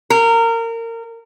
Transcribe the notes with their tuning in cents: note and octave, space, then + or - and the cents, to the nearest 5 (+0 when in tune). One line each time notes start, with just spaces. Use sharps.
A#4 -25